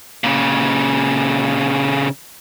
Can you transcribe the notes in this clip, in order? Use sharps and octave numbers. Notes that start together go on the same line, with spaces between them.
A#2 C#3